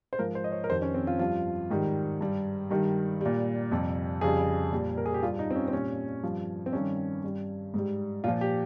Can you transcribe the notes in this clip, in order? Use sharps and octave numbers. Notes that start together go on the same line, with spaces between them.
C5
G#2 F3 A#4
C5
D#5
C#5
A#4
F2 D#3 G3 C5
C#4
C4
F4
G2 F3 F4
G#2 D#3 G3
G2 G3
G2 D#3 G3
A#2 G3
F2 C3 G3
F2 C#3 G3 G#4
A#2 G3
A#4
G#4
G4
G2 G3 F4
D#4
C4
C#4
C4
A#2 G3 C#4
G2 F3
C4
G2 D#3 G3 C#4
G2 G3
G#2 G3
A#2 F3 F4
G4